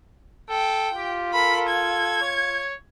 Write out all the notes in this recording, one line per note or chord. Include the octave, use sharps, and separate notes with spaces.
A4 G5
F4 G4
A4 A#4 B5
G#6
C#5